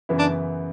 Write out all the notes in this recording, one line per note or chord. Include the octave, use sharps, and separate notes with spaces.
F#2 C#3 E3 B3 E4
D4